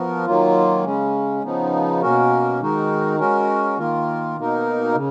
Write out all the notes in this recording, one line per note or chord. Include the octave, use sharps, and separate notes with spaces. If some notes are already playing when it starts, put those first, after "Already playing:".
Already playing: F3 B3 F#4 A#4
D#3 F#3 A#3 F4
C#3 G#3 C#4
C#3 F3 B3 D#4
B2 A#3 C#4 F#4 A#4
D#3 G#3 D#4 F#4 A#4
G#3 C#4 F#4 A#4
D#3 A#3 F4 A#4
B2 A#3 D#4 A#4
C#3